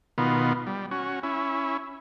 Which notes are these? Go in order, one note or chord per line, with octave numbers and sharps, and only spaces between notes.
B2 D#3 B3 F4
G3
C#4 F#4
C#4 E4